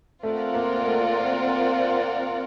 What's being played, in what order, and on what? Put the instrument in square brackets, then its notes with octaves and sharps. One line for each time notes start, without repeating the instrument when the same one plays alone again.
[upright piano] A3 [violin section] C4 F4 A#4 D5 F#5
[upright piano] A#3
A#3
A3
A#3